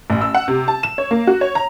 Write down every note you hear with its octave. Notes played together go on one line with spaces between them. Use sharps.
A1
E6
F#5
C3
A5
E7
C#5
A#3
F#4
C#5
A#5